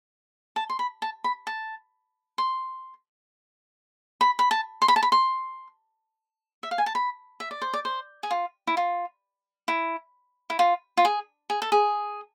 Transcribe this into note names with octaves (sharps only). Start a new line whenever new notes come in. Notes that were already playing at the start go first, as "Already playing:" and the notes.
A5
C6
B5
A5
B5
A5
C6
B5
B5
A5
C6
B5
A5
B5
C6
E5
F5
G#5
A5
B5
E5
D5
C5
D5
C5
G#4
F4
E4
F4
E4
E4
F4
F4
G#4
G#4
A4
G#4